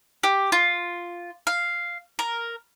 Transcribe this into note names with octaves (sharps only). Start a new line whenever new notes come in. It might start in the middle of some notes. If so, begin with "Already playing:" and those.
G4
F4
F5
A#4